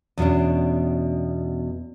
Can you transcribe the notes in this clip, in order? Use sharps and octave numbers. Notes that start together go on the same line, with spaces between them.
E2 B2 C#4 D4